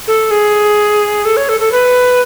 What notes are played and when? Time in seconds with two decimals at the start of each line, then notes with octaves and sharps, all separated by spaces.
0.08 A4
0.31 G#4
1.25 A4
1.37 C#5
1.49 A4
1.60 A4
1.72 B4